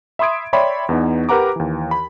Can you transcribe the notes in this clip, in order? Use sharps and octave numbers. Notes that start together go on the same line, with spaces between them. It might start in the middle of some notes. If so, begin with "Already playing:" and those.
E5 B5 C6 D#6 G#6 D7
C#5 D5 E5 G5 B5 C6
E2 B3 D#4
G4 A#4 B4 F#5 A#5 D6
D#2 E3
B5